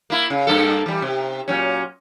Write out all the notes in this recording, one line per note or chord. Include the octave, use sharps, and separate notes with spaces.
A#3 E4
C#3
G2 A#3 A4
E3 G3
C3
A#2 F#3 C#4